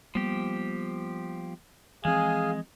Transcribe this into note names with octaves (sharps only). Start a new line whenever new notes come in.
F3 G3 A#3 B3 G4
E3 F3 G#3 C4 G#4 F5 G#5